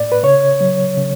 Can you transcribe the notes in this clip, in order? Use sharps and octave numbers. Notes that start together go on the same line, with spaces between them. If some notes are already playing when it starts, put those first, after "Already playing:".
Already playing: A2 D5
B4
C#3 C#5
F#3
C#3